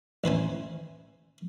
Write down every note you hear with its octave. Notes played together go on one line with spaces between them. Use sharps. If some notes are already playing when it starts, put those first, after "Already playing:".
A1 B4 C5 G#5